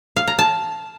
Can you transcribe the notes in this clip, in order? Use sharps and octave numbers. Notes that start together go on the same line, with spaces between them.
F5
A#5
A5